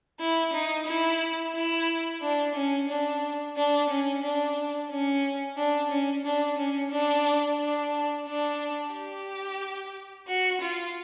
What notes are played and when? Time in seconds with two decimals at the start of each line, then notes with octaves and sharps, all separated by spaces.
0.20 E4
0.53 D#4
0.87 E4
1.54 E4
2.22 D4
2.55 C#4
2.88 D4
3.56 D4
3.89 C#4
4.23 D4
4.90 C#4
5.57 D4
5.91 C#4
6.25 D4
6.57 C#4
6.91 D4
7.58 D4
8.26 D4
8.93 G4
10.27 F#4
10.61 F4